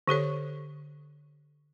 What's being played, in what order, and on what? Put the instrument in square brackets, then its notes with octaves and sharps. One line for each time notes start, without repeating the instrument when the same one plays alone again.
[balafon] D3 G4 A4 C#5